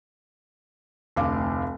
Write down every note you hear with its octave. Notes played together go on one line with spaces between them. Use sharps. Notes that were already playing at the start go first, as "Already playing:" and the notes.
F1 D2 F5 D6